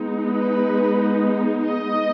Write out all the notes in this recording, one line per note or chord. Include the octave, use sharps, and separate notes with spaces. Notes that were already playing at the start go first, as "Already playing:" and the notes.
Already playing: G#3 B3 D#4
B4
D#5